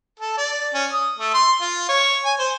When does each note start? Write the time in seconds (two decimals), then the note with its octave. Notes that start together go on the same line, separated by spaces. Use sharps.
0.20 A4
0.38 D5
0.74 C#4
0.93 D#6
1.19 A3
1.34 C6
1.61 F4
1.89 C#5
2.25 G#5
2.39 C5